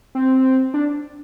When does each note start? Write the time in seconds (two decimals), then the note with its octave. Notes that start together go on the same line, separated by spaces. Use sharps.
0.15 C4
0.74 D4